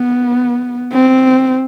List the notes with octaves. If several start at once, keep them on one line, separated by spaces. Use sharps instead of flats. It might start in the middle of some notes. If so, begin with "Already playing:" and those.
Already playing: B3
C4